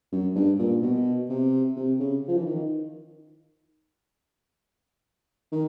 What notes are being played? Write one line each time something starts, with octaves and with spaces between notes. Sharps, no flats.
F#2
G2
A#2
B2
C3
C3
C#3
F3
E3
D#3
D#3